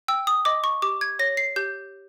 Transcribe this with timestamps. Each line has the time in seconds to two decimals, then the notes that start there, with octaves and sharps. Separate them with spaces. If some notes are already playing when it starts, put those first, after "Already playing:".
0.08 G5 E6
0.27 D#6
0.45 D#5 D6
0.64 C#6
0.82 G4 D6
1.01 G#6
1.19 C#5 A#6
1.37 C7
1.56 G4 G6